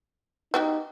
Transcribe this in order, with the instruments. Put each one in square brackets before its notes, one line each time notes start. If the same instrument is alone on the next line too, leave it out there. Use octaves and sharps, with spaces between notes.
[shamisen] B3 F#4 G4 [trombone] D#4